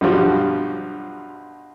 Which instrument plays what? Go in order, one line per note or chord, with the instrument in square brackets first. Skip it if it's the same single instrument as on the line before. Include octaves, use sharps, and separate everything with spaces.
[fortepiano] B1 G2 F3 F#4